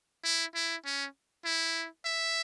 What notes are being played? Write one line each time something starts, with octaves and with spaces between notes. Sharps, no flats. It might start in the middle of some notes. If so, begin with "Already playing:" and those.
E4
E4
C#4
E4
E5